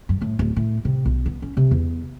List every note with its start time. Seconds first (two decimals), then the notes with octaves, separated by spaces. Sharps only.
0.09 F#2
0.22 A2
0.39 D1
0.56 A2
0.85 C3
1.05 B1
1.26 B3
1.42 C#4
1.57 C3
1.71 E2